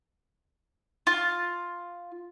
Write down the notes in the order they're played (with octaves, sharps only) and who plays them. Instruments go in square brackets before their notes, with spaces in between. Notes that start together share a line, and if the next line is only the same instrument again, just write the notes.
[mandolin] F4